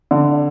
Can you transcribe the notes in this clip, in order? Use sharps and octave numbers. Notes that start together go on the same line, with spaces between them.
D3